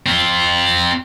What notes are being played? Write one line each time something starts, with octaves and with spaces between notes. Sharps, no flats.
C4 F4